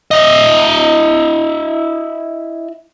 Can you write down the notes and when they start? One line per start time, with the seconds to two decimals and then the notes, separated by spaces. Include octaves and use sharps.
0.11 E4 D#5